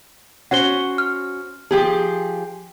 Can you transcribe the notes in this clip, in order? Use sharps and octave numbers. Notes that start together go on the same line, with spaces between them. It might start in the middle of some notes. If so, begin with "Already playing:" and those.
C#4 F#4 C5 F#5 G7
F6
F3 G4 G#4